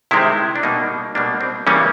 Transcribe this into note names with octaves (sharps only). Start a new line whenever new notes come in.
C3 D#3 G#3 C4 E4
D4
B2 G3 A#3 D#4
B2 G3 A#3 D4
C4
C#3 E3 G3 A#3 C#4